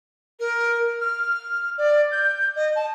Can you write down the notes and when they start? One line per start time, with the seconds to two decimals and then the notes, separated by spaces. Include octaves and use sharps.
0.40 A#4
1.01 F6
1.78 D5
2.12 G6
2.56 D#5
2.76 A5